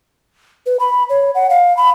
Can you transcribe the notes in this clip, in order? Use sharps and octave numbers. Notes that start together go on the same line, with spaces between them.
B4
B5
C#5
F#5
F5
B5